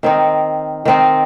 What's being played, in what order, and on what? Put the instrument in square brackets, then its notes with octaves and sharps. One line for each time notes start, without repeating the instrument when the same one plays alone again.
[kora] D#3 C4 D#4
D#3 C4 D#4